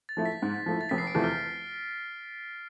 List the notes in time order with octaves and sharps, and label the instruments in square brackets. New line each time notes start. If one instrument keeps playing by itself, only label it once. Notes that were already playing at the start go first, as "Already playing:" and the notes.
[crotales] A6
[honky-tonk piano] F3 A3 E4
[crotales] B6
[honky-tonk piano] G#2
F3 A3 E4
[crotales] A6
[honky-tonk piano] F1 [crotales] B6
[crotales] C7
D7
[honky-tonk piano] E2 C3 F3 A3
[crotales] F6